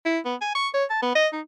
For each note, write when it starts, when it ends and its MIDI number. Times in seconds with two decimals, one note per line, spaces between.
0.06 0.19 64
0.25 0.35 59
0.41 0.55 80
0.55 0.69 85
0.74 0.85 73
0.90 0.99 81
1.02 1.15 59
1.15 1.28 75
1.33 1.41 63